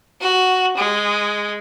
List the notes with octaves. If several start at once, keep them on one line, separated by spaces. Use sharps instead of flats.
F#4
G#3